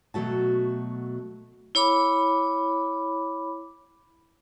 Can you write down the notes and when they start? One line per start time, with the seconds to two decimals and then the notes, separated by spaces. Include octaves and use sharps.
0.14 B2 F#3 A3 F#4 A5
1.75 E4 C#5 B5 D6